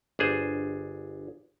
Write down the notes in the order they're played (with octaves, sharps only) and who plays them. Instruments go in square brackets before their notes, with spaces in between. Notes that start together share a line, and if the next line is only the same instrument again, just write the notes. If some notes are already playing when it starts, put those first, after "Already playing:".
[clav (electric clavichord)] G1 D4 G#4 C5